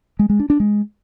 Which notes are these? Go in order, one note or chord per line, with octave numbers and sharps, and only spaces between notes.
G#3
G#3
D4
D4
G#3